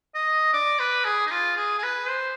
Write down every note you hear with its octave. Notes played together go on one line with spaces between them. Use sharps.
D#5
D5
B4
G#4
D#4
F4
G#4
G#4
B4
C5